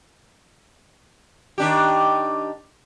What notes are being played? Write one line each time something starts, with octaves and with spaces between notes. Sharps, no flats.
D#3 D4 G4